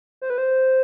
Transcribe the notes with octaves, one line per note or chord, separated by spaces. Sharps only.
C5
B4
C5